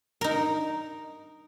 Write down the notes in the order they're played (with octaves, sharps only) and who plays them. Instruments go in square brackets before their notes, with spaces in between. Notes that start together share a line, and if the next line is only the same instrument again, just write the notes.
[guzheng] D#4 A#4